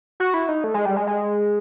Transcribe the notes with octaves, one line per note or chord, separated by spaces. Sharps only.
F#4
E4
D#4
A3
G#3
G3
G#3
G#3